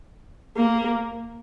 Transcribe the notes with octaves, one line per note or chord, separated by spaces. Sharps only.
A#3